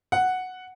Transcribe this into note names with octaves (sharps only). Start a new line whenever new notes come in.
F#5